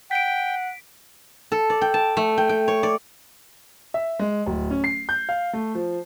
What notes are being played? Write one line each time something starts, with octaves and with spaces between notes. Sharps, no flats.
F#5 G5 B6 D7
A4
D5
G5
A5
A3
G5
G5
C#5
D5
E5
G#3
D1
C#4
C7
G6
F5
A3
F3